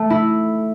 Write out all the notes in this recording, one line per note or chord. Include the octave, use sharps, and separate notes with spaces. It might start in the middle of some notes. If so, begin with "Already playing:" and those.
Already playing: A3
E4